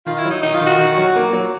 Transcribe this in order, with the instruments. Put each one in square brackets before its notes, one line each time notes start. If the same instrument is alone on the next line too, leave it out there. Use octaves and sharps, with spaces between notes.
[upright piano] D#3 [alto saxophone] F4
[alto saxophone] E4
[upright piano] F#3
[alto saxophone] D#4
[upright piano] D#3 [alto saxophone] D#4
[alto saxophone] F4
[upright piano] D#3
[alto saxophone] F#4
[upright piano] D#3
F#3
A#3
F#3